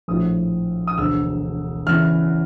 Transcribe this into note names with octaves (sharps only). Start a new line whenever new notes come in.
A#1 A2 F3 D#6
D#6
E1 D2 D3 E6
E2 C#3 E3 F6